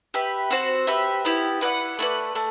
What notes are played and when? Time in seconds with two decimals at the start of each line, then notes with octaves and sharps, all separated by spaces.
0.14 G4 B4 E5
0.50 C4 F#4 C5
0.87 G4 B4 E5
1.25 B3 E4 G4
1.61 E4 B4 D5 F#5
1.99 A3 E4 B4 D5
2.35 A3